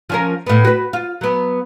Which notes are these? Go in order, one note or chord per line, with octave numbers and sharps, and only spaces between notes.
F3 C#4 A#4
A2 B3
F#4 B4
F4
F#3 B3